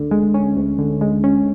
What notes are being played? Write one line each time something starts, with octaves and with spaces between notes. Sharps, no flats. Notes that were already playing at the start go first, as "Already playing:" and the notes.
Already playing: D2 D3
G#3
C#4
D2
D3
G#3
C#4